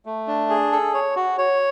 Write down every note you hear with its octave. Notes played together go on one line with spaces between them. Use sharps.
A3
D4
G#4
A4
C#5
F#4
C#5